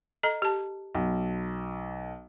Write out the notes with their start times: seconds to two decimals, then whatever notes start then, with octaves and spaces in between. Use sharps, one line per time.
0.23 A4 D#5 A#5
0.42 G4 A5
0.95 B1